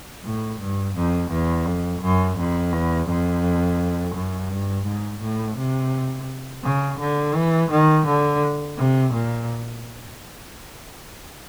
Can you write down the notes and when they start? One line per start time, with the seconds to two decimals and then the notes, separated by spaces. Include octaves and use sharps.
0.24 A2
0.60 G2
0.95 F2
1.31 E2
1.66 F2
2.02 F#2
2.38 F2
2.73 E2
3.09 F2
4.15 F#2
4.50 G2
4.86 G#2
5.22 A2
5.57 C3
6.64 C#3
7.00 D3
7.35 E3
7.71 D#3
8.06 D3
8.77 C3
9.13 A#2